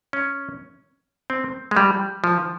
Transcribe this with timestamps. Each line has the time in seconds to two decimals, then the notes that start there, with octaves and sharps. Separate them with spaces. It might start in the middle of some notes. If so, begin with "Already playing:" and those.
0.13 C#4
1.30 C4
1.71 G#3
1.76 G3
2.24 F3